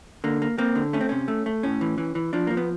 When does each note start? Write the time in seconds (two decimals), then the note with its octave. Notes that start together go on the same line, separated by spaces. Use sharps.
0.24 D3 A#3
0.42 A#3
0.58 A#3 C4
0.76 D3
0.93 A3 C#4
1.01 C4
1.09 C3 C#4
1.28 A3
1.46 A3
1.63 A2 C#4
1.81 E3
1.98 E3
2.15 E3
2.33 F3 D4
2.47 F3 A#3
2.57 B3